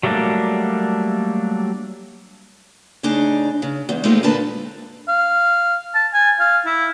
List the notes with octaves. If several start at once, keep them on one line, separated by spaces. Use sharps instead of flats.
F#3 G3 A3 A#3 D4
A2 C#3 D4 D#4 G#4
C#3
E2 G#2
A#2 G#3 A3 C4 D#4 F4
A#2 D3 A#3 D4 B4 A5
F5
A5
G#5
F5
E4